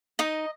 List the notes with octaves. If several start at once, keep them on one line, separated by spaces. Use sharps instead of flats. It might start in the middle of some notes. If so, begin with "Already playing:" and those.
D#4 D#5